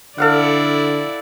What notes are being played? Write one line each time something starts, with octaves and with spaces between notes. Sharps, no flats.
D3 E4 A4 D5 F5 F#5